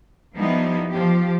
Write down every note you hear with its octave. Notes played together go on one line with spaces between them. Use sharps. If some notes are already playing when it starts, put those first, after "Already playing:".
F3 G3 B3 D#4 E4
F3 G4